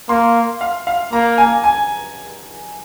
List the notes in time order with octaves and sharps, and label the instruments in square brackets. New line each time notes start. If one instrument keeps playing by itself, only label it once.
[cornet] A#3 [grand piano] C6
[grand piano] F5
F5
[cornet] A#3 [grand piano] A#5
[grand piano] G#5
G#5